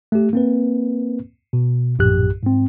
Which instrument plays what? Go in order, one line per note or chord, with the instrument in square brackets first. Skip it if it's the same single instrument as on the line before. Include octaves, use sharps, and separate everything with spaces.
[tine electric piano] A3 G4
A#3 C4 B4
B2
A#1 F#2 A2 G4 F#6
G#2 C4